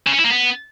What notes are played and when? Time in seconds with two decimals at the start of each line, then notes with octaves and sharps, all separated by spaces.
0.07 C#3
0.12 C#4
0.18 E4
0.24 A#3
0.30 B3